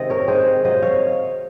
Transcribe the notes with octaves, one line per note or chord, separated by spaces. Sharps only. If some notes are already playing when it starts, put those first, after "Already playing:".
Already playing: C3 D#3 G#3 C4 D#5
A#4 C#5
C3 D#3 G#3 C4 G#4 C5
C3 F#3 A#3 C5 D#5
C#5 F5